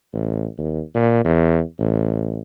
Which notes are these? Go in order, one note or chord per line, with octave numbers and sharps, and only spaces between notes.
A1
D#2
A#2
E2
A1